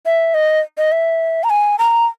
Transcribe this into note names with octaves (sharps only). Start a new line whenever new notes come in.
E5
D#5
D#5
E5
A#5
G#5
A#5